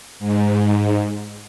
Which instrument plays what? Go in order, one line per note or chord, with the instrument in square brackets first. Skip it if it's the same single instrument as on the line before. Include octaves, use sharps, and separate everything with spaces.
[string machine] G#2